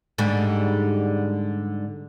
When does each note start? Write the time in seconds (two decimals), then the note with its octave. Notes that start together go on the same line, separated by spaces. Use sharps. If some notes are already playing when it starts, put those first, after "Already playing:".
0.18 G#2 D3 G3